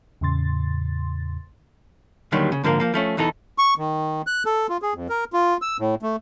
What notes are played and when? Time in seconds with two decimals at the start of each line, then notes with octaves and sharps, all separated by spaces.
0.21 E2 A2 C#3 C6 A6
2.32 D#2 D3 D#3 F#3 G3
2.52 C#3
2.64 G#2 D3 F3 A#3 A#4
2.80 F3 A#3
2.94 F3 A3 C#4
3.17 E2 E3 D#4 F4 A4
3.58 C#6
3.78 D#3
4.27 F#6
4.45 A4
4.69 F4
4.82 G#4
4.94 F2
5.09 A#4
5.33 F4
5.62 E6
5.79 A2
6.02 A3